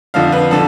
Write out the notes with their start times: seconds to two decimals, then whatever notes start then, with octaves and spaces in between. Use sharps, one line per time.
0.14 F2 D3 F3 F5
0.32 B4
0.51 D3 F3 A4